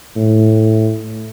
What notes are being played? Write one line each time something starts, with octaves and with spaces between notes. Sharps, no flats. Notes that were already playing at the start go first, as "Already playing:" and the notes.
A2